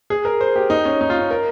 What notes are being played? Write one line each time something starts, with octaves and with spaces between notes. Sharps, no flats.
G#4
A#4
C5
G4
D#4
C#4
D#4
F4
C#4
A#4